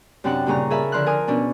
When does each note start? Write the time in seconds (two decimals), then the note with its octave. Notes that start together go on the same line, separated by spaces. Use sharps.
0.24 F#2 C3 C4 D4 D#4 F#5
0.46 G2 A#2 C#3 C#4 A#5
0.70 G#4 A#4 E5 A5 B5
0.92 D3 F3 C6 F6 F#6
1.06 A#4 G#5 D#6
1.28 B2 C#4 D4